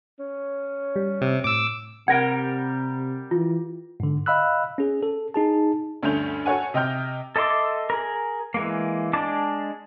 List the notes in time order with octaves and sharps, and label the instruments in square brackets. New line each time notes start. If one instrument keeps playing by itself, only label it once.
[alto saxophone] C#4
[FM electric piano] G3
[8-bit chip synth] C3
[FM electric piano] A2 [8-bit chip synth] D6 E6
[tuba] C3 [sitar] G3 A#4 [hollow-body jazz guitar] F#5 [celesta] G#6 A#6 D7
[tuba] E3 [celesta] F4
[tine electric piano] G#2 D3
D#5 F5 B5 E6 F#6
C#4 G#4
A4
D#4 G#4 A5
[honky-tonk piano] D2 G2 A3 C#4 G6 F7
F#4 A4 C#5 F#5 G#5
C3 D#5 G5 F6 G6
[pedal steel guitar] A4 D#5 E5 C6 D6
G#4 A#4
E3 G#3 A#3
G#3 D4 D#5 A5 D6